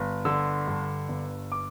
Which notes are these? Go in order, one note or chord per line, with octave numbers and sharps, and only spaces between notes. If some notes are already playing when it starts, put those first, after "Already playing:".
Already playing: G1
D3 E6
G2
G1
D6